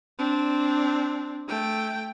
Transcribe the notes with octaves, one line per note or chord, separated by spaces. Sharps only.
C4 D4
A3 G5